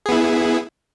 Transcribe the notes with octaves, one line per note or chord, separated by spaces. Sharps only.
B3 E4 G#4